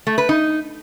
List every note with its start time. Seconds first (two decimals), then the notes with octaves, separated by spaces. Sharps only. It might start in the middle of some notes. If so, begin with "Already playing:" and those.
0.07 A3
0.18 B4
0.29 D#4